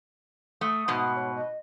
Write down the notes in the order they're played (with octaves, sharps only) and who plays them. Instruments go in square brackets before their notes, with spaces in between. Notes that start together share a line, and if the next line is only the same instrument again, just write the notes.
[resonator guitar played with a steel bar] A3 [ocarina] D#6
[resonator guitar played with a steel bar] G#2 B2
[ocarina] C#5
D#5